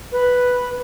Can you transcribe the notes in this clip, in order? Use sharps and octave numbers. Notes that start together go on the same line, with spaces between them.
B4